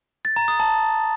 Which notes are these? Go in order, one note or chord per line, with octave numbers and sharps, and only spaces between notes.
A6
A#5
D#6
A5